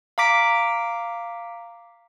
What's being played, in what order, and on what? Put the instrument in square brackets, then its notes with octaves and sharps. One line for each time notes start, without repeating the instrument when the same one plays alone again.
[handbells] F5 A#5 D6 B6 D7